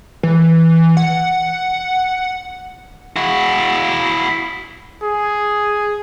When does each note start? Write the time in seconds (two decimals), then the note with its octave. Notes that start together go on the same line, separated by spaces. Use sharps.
0.23 E3
0.97 F#5
3.16 E4 F#4
5.03 G#4